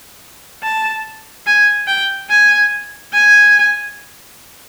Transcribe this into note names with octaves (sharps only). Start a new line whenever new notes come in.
A5
G#5
G5
G#5
G#5